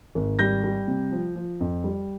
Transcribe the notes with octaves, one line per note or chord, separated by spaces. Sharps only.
G#1
G3 G6 A#6
G3
C3
F3
F3
F2
G3